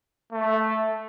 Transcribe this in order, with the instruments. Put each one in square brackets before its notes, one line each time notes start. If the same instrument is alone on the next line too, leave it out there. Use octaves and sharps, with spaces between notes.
[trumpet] A3